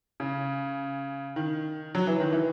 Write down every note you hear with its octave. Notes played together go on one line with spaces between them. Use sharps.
C#3
D#3
F#3
E3
D#3
E3